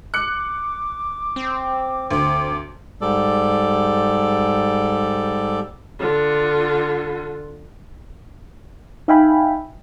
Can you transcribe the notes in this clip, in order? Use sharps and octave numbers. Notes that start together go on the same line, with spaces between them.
D6 F#6 C#7
C4
D2 D6
G#2 G3 A4 D5
D3 F4
D#4 E5 F5 G5 G#5 B5